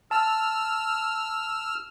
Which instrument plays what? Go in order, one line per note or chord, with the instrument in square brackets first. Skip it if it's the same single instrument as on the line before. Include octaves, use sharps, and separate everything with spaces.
[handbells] A5 [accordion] E6 F6